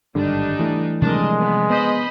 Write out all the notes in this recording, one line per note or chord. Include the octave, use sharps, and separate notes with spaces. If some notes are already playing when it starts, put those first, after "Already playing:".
G#1 G2 D3 G3 D4 D#4
E3 A3
C3 F3 G3 G#3 D4 A#4 D#5
B3
B3 C5 D#5 B5